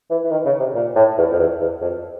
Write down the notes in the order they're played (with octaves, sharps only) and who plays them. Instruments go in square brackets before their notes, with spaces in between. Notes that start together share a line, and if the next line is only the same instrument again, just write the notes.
[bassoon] E3
E3
D#3
C#3
C3
A#2
A2
E2
F2
E2
E2
F2